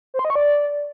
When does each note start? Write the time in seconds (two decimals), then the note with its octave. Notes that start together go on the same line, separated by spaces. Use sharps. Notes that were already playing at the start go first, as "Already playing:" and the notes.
0.14 C5
0.19 C6
0.25 D#5
0.30 C#6
0.35 D5